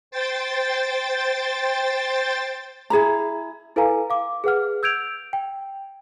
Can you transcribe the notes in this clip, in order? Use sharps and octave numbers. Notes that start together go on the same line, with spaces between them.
C5 G5 A6
E4 G#4 B4 A#5
E4 A4 B4 F5 G#5 A#5
F5 D6
G#4 B4 F#5 F6
E6 G6 G#6 D7 F7
G5